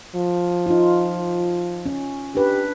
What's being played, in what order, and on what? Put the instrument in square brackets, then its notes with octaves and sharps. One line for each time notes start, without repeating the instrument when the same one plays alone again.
[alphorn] F3
[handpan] D#4 F4
C#4
[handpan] D4 B4 [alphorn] G4